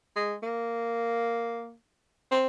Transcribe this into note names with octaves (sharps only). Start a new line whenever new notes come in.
G#3
A#3
C4